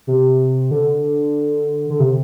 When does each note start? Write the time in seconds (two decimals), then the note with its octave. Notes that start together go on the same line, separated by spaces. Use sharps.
0.07 C3
0.71 D3
1.90 D3
2.00 C3